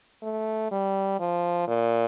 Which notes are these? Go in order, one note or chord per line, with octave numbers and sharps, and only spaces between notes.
A3
G3
F3
A#2